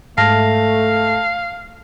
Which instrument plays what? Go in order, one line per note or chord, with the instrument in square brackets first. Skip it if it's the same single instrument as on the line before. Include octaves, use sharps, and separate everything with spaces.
[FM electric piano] G#2 [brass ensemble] A3 [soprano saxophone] F5 [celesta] A5 F6 A#6